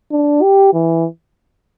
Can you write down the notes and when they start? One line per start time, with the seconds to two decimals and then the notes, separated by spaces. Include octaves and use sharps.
0.12 D4
0.42 G4
0.73 E3